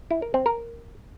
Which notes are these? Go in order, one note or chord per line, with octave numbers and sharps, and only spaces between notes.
E4
A#4
C4
A#4